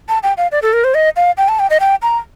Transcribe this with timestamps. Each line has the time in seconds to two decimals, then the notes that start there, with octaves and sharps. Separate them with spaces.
0.09 A5
0.23 G5
0.37 F5
0.52 D5
0.62 A4
0.73 A#4
0.84 C5
0.95 D#5
1.16 F5
1.37 G5
1.48 A5
1.59 G5
1.70 D#5
1.80 G5
2.02 A#5